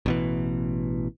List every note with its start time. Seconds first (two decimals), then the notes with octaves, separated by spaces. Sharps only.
0.06 A1 B2 E3